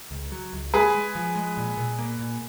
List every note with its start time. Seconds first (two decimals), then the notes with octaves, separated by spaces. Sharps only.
0.11 C#2
0.32 F#3
0.53 C#2
0.74 G#3 G#4 B4
0.94 G#3
1.15 F3
1.35 G#3
1.57 A#2
1.77 A#2
1.99 A#3
2.19 A#2